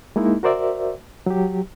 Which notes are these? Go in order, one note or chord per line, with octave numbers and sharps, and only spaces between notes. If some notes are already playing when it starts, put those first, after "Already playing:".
G#3 A#3 D#4 E4
F#4 A#4 C5 D5 E5
F#3 G4